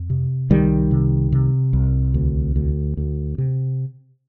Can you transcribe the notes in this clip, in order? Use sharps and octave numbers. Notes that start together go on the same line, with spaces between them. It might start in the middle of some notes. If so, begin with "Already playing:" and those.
Already playing: F2
C3
C2 D#3 G3
C3
C3
C2
D2
D2
D2
C3